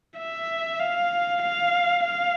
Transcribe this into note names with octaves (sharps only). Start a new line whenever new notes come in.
E5
F5
F5
F5